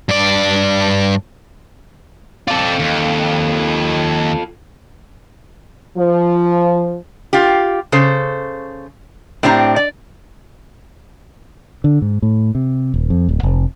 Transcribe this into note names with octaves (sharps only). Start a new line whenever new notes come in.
G2 D5
C4 F4 A4 D5
D#2
F3
F4 G4
C#3 A4 C5
A2 C4 D4 G4 A#5
D5
D3
G#2
A2
C3
D#1
F2
D1
F1